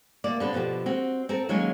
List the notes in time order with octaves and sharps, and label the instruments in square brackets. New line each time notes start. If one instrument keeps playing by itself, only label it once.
[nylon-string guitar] D2 A#3 D5
D3 B3 C4
B2 D3 F3 F#4 G4
C4 F#4
C4 A4 A#4
D#3 F#3 G#3 A#3 C#4 C#5